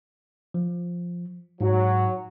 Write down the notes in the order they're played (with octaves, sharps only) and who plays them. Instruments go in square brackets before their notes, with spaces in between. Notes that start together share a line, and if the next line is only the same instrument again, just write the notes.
[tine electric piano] F3
[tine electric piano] G#2 [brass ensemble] F#3